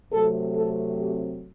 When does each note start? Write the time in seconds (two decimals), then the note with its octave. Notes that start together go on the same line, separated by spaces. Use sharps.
0.13 C3 F#3 A3 C4 A4
0.55 A4
0.98 G4